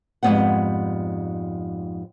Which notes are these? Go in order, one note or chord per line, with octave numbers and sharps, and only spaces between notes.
F2 G#2 G3 B3 C5 F#5